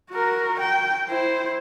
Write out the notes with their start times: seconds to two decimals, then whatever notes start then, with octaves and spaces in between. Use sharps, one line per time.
0.10 F#4 A#4
0.60 G5
1.09 E4 C5